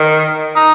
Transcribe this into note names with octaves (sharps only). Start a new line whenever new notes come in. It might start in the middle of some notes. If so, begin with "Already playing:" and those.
Already playing: D#3
D#4